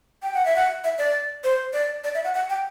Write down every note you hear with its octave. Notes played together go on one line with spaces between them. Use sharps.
G5
F#5
E5
F#5
E5
D5
C5
D5
D5
E5
F#5
F#5
G5